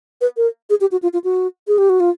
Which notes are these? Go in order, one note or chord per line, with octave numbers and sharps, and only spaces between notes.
B4
A#4
G#4
G4
F#4
F4
F4
F#4
G#4
G4
F#4
F4